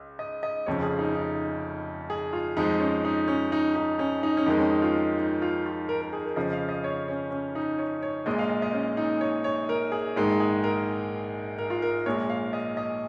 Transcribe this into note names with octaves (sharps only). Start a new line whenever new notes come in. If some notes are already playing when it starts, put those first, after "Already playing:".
Already playing: C#2
D#5
D#5
F1 F2 C#3 F3 C#5
G#4
D#4
D#4
G#4
F4
F2 F3 G#3 D#4
C#4
D#4
C#4
D#4
D#4
C#4
D#4
C#4
F2 D#3 G#3 D#4
C#4
D#4
F4
D#4
D#4
F4
F4
A#4
A#4
G#4
A#4
F2 C#3 F3 D#5
F5
D#5
C#5
C#4
C#4
D#4
C#5
C#5
A#1 A#2 G#3 D#5
F5
D#5
D#5
C#4
D#4
C#5
C#5
A#4
G#4
A#1 G#2 D#3 G#3
G#4
A#4
A#4
F4
A#4
A#1 A#2 G#3 C#5
F5
D#5
D#5